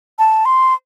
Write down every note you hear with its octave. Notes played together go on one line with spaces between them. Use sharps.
A5
C6